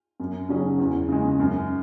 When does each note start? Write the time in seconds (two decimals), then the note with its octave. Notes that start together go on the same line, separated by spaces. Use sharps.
0.20 F#2
0.49 C#3 F#3 C#4 G#4
0.78 E2
1.09 C#3 G#3
1.39 F#2